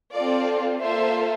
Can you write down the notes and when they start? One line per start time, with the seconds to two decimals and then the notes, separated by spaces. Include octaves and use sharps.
0.13 C4 F4 A4 D5
0.80 A#3 F4 A4 C5 E5